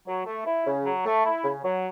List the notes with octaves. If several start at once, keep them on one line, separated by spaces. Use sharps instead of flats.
F#3
A3
E4
C#3
F#3
A3
E4
C#3
F#3